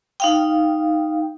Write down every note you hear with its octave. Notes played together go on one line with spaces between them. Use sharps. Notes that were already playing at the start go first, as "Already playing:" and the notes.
D#4 F5 G5